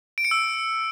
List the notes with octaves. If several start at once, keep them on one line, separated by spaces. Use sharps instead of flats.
D7
C#7
E6